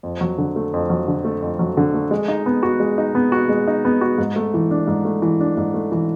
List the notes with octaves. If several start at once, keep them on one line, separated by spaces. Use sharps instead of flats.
F2
F#3
D3
A3
F2
F#3
D3
A3
F2
F#3
D3
A3
G#3
D#4
B3
F#4
G#3
D#4
B3
F#4
G#3
D#4
B3
F#4
G#2
A3
E3
D4
G#2
A3
E3
D4
G#2
A3
E3